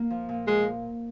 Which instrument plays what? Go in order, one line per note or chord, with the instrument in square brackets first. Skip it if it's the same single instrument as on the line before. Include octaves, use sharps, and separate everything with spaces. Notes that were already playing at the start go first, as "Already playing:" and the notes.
Already playing: [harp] A#3
F3
A#2
[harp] F3 [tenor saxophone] G#3